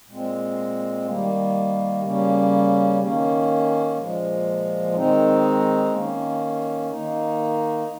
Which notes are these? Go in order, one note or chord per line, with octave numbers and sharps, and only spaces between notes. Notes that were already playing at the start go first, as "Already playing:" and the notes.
A#2 G#3 C4
D#3 G3 A#3
C#3 G3 A#3 C#4
D#3 A#3 C#4
A#2 F3 G#3
D#3 G#3 C4 D#4
D#3 A#3 C#4
D#3 A#3 D#4